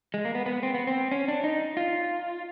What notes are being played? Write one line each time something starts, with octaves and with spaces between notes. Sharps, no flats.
G#3
A#3
B3
B3
C4
B3
C4
C#4
D4
D#4
F4